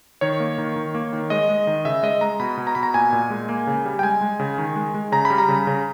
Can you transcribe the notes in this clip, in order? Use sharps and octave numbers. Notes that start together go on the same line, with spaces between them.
D#3 C#5
A#3
D#3
D#3
A#3
D#3
G#3 D#5
G#3
D#3
C#3 E5
G#3 D#5
G#3 A#5
B2 B5
B2
A#5
B2 B5
A#5
A#2 G#5
A#2
G#3
A#3
C#3
G3
G5
G#3 G#5
G#3
C#3
D#3
G#3
G#3
C#3 A#5
B5
G3
A#5
C#3
C#3